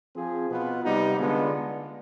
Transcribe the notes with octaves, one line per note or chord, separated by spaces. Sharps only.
F3 C4 F4 G#4
B2 B3 F4 B4
C3 G3 B3 D#4
D3 G#3 B3 D4 F4